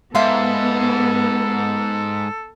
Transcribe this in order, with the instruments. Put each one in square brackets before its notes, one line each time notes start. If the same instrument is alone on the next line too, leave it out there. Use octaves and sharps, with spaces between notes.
[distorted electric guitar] G#2 [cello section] B3 [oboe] A4 [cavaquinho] E5 F5 C6